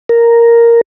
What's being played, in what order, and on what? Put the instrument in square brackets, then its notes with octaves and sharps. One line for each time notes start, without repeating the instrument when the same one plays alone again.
[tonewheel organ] A#4